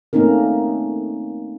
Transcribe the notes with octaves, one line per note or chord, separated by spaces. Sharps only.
A3 A#3 C4 C#4 D#4 A#4